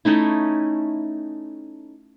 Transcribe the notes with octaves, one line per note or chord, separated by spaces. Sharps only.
A3 C#4 D#4 E4